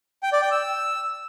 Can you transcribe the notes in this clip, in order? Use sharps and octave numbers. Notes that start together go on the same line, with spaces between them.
G5
D5
G5
E6